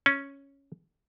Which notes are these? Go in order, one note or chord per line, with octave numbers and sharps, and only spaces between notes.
C#4